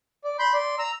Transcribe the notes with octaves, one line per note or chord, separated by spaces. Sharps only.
D5
B5 C6 G6
D5 C6
A#5 E6